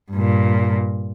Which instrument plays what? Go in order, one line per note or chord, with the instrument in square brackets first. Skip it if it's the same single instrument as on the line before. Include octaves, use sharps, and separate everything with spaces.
[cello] G2 A#2